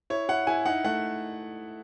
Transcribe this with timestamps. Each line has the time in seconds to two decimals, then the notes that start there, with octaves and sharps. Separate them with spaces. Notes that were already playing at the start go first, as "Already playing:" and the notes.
0.10 E4 C#5
0.29 E4 F#5
0.47 E4 G#5
0.66 D#4 F#5
0.84 A3 F#5